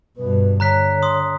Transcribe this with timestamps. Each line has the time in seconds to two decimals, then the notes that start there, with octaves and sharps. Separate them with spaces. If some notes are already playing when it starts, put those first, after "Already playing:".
0.18 G2 B2 B4
0.60 D3 C#5 A#5 F#6 B6
1.02 C6 D#6